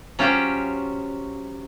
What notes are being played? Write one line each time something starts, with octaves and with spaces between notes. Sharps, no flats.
F#3 C#4 F4 G4 C5 G5